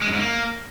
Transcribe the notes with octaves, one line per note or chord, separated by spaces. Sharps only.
G#3
F#2
G#2
A#3